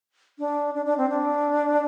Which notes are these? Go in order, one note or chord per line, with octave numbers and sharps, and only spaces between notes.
D4
D4
D4
C4
D4